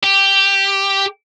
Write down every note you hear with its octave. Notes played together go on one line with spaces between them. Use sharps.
G4